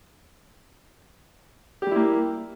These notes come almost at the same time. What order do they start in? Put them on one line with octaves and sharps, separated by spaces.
G4 G3 E4 A#3